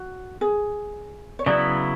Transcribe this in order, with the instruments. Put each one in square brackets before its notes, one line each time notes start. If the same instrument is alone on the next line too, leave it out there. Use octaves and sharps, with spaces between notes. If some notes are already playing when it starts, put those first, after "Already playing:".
Already playing: [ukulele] F#4
G#4
C#5
[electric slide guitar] C#3 F#3 B3 E4 [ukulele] D5